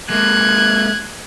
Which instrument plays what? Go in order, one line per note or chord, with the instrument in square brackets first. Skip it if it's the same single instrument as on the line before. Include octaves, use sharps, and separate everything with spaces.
[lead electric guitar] G#3 A#3 [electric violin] F#6 G#6